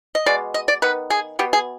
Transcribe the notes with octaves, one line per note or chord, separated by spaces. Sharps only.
D#5
B2 G#3 D5
D#5
D5
D#3 B3 B4
G#4
B2 B3 G4
G#4